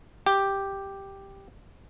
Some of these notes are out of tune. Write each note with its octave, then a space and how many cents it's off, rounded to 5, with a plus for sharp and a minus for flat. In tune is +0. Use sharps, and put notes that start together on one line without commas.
G4 +0